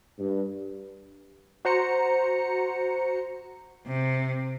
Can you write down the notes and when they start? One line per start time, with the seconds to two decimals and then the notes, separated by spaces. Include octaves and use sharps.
0.18 G2
1.65 F#4 C5 A#5 C#7
3.86 C3